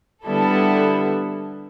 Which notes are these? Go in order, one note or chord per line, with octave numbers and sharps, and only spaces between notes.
D3 G3 B3 E4 A4